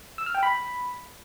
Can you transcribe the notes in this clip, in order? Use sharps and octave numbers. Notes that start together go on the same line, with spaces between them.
E6
F6
G5
B5